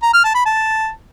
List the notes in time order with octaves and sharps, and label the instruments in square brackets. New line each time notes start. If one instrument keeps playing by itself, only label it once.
[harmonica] A#5
F6
A5
B5
A5